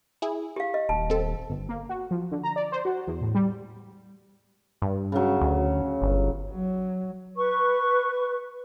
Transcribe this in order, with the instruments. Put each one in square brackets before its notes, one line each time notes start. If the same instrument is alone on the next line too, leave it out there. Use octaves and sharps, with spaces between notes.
[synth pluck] E4 G#4
[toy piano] G4 F5
D#5
[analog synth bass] D#1 [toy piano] A5
[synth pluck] C4 A4
[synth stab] G1
A#3
F#4
F3
D3
A#5
D5
C5
F#4
E2
A2
G3
[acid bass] G2
[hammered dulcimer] C#3 F#3
[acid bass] D2
G1
[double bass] F#3
[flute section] B4 C#6